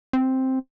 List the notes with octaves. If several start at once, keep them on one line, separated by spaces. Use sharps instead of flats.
C4